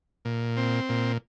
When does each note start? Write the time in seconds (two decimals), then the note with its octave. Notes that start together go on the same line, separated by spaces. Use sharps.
0.25 A#2
0.57 C4
0.89 A#2